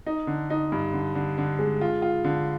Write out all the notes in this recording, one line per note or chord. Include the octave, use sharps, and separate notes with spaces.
D#4
D3
D#4
G2
D3
D3
D3
G#3
F4
F4
D3